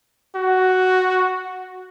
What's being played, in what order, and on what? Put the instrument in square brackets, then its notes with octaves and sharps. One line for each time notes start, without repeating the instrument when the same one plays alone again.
[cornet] F#4